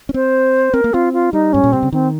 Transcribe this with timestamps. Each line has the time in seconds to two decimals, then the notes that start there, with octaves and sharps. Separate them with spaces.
0.09 C#4
0.14 C4 C5
0.74 C4 A#4
0.84 A#3
0.94 C4 F4
1.13 F4
1.33 G3 D#4
1.53 G#2 C#4
1.64 A#2
1.72 C3 C4
1.83 C#3
1.92 D#3 C4